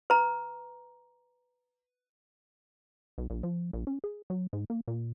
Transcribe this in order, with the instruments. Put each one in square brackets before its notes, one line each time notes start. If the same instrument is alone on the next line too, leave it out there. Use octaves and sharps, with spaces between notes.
[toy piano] B4 A#5
[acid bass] B1
A#1
F3
A#1
C#4
G#4
F#3
G#2
A#3
A#2